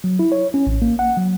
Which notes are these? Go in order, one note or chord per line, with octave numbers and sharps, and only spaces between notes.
F#3
E4
C#5
C#4
A1
A#3
F#5
F#3